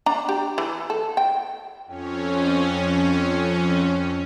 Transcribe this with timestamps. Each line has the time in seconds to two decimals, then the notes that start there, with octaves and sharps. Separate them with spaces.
0.06 D4 A#5
0.29 G4
0.58 E3
0.90 A4
1.17 G5
1.86 F2 C#4